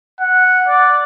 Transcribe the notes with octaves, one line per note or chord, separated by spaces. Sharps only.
F#5
D5